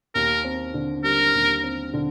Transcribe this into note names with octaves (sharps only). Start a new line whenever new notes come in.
D#2 A#4
C4
D3
G3 A#4
D#2
C4
D3